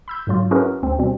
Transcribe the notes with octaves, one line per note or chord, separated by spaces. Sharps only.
B5 E6 G6
G#2 D3 F#3 F4
C#4 E4 F#4 G#4 A#4 B4
D2 C4
B2 G3 C4